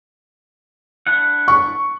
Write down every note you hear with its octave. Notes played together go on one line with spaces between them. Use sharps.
D4 E4 F#5
C#6